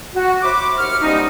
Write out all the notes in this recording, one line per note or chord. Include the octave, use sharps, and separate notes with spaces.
F#4
C5 C#5 E5 B5 C6 D6
D#2 C#6 F6
F3 G3 G#3 B3 C#4 D#4